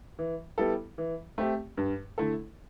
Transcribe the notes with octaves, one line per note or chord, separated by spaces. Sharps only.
E3
G3 B3 E4 A4
E3
A3 C4 G4
G2
D3 A3 E4 A4